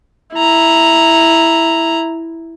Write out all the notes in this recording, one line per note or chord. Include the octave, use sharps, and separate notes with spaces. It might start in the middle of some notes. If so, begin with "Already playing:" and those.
E4 A#5